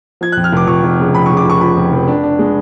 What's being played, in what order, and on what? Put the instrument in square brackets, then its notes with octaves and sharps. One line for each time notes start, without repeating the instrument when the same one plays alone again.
[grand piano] F3 G#6
F2 F#6
F6
F1 D6
F2 C#6
F1
C#3
F2 B5
C#3 C#6
D6
F1 C#6
F3 B5
F2
F1
D4
D4
G#3